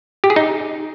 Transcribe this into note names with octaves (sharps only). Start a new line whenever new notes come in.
G4
G#4
D#4